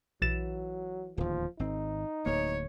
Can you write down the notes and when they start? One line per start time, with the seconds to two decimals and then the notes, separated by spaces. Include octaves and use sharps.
0.22 A#1 E3 F#3 A6 E7
1.17 D1 D#2 F3
1.59 G#1 C4 D#4
2.26 D1 D2 A#3 C#5